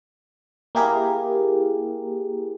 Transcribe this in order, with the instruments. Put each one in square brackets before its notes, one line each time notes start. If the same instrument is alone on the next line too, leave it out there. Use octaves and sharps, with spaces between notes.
[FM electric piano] A#3 E4 G4 G#4 A#4